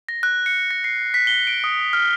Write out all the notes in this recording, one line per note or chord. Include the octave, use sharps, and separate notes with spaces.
A#6
F#6
C#7
A#6
C7
B6
G7
D7
D#6
F6